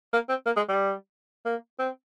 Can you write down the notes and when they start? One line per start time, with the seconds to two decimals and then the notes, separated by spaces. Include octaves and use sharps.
0.13 A#3
0.29 C4
0.46 A#3
0.56 G#3
0.69 G3
1.46 A#3
1.79 C4